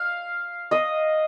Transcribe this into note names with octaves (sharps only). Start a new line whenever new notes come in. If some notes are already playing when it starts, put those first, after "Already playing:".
Already playing: F5
D#5